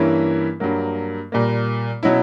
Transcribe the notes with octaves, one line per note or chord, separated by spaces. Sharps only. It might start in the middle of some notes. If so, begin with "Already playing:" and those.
Already playing: G2 E3 A#3 C#4 E4
G2 F#3 A#3
A#2 G3 A#3
B2 F#3 C#4 E4